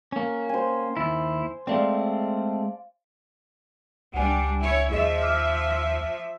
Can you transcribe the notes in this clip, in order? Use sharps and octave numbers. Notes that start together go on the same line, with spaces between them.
A#3 C#4
C5 G#5
D#2 E4
G#3 A3 C4 D5 F5
C#2 G3 D4 F#5 G#5
E4 C#5
D#2 F3 G#4 D#5 E5 E7
D6 F6